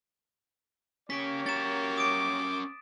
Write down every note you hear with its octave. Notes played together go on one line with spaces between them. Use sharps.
C#3 A#3 C#4 G4 C#5 B6 D7
C#4 A#4 A6 E7
D6 D#6 D7